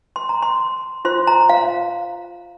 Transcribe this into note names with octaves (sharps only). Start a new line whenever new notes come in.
C6
A#5
C6
F4 C5 C6
A#5
F5